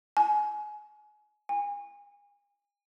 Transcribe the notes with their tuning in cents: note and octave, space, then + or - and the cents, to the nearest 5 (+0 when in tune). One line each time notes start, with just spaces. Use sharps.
G#5 +25
G#5 -35